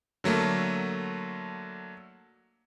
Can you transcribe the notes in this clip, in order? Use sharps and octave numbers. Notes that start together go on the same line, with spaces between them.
D3 F#3 A3 A#3